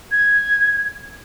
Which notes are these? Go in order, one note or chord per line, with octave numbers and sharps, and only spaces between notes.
G#6